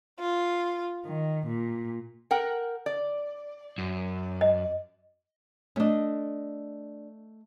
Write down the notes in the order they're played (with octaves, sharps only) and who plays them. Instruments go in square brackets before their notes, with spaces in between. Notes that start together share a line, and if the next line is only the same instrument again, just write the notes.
[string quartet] F4
D#3
A#2
[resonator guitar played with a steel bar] A#4 F#5 G5
D5
[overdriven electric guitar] F#2
[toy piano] D#5
[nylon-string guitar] A3 D#5 [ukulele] C#4 D4